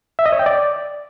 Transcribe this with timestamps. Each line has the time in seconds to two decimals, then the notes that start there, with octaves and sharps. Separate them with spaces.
0.19 E5
0.26 D#5
0.32 C#5
0.39 G5
0.46 D5